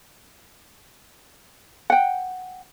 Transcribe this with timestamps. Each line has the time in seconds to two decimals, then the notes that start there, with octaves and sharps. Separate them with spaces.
1.90 F#5 G5